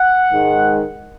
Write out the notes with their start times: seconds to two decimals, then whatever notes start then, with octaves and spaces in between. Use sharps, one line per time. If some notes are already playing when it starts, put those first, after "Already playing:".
Already playing: F#5
0.32 G#2 D#3 G#3